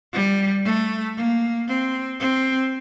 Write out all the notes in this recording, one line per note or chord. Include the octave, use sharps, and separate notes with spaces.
G3
A3
A#3
C4
C4